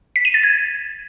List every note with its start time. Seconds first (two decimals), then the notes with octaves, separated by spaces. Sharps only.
0.16 B6
0.25 D#7
0.34 A6
0.43 G#6